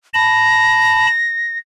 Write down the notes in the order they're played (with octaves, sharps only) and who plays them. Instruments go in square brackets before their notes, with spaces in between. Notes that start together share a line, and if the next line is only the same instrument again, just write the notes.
[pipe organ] A5 B5 [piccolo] A#6